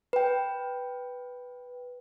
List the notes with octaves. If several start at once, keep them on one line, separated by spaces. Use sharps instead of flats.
B4 G5